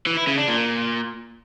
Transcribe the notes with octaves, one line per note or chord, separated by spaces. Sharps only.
E3
E4
C#3
D4
A#2